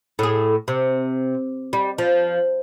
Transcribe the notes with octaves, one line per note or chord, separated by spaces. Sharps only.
A2 G#4
C3
G3
F3